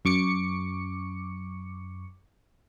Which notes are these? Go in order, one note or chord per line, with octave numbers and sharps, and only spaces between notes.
F#2 C#6 D6 C#7